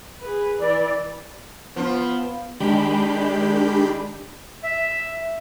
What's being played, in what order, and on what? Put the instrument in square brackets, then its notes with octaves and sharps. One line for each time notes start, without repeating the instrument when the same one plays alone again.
[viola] G#4 B4
[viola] E3 [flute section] D5
[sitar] F3 F4 [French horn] B3
[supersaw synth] D#3 G#3 D4 G4 B5 G6
[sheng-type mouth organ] E5